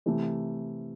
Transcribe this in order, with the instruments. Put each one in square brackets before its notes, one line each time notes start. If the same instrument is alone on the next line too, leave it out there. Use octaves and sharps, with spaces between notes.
[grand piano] C3 E3 A3